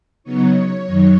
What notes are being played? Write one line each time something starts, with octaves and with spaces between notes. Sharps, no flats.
C#3 F#3 B3 D#4 C#5
F#2 D#3 F#3 D#4